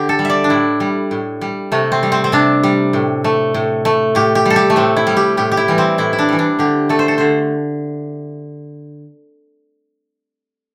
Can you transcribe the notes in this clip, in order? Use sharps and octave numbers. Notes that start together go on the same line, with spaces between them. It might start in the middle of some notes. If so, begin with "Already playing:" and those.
Already playing: D3 G4
A4
G3
D5 E5
D4
A2 E4
G3
A2
G3
C3 A3
C4
G3
C4
C4
C3 D4
G3
A2
A3
A2
A3
A2 G4
G4
G3 A4
G4
A3
A2 C4
E4
G3
G4
A2 G4
G4
E4
E3 G3
C4
A2 E4
E4
D4
E3 G3
D4
D3 G4
A3 A4
C5
A4
D3 C5